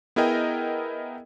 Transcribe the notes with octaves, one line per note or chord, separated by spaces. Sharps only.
B3 E4 G#4 A#4 D#5 G5